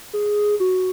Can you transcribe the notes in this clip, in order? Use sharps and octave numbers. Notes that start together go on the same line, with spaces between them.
G#4
F#4